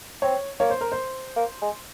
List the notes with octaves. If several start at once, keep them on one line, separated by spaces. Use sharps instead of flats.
C4 C#5
A#3 C#5
C5
A#4
C5
A#3
G#3